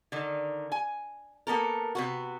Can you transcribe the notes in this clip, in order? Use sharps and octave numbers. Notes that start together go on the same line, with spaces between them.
D3 D#3
G#5
A#3 B3 A4 A#4
C3 B3 F#4